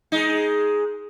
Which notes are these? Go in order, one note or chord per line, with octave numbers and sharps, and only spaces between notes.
G#3 D#4